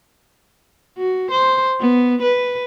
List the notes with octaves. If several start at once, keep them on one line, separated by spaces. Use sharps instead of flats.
F#4
C5
B3
B4